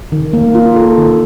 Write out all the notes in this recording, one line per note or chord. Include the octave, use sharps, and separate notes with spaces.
D#3
A#3
F4
A4
D#3